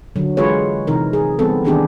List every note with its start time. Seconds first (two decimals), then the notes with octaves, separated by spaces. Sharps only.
0.16 D3 F#3
0.37 E3 G#3 F4 G#4 B4 C#5
0.87 C3 E3 D#4 A#4
1.13 G#4
1.39 E3 G3 B3 C4 A4
1.64 D#3 E3 B3 D4 G4 G#4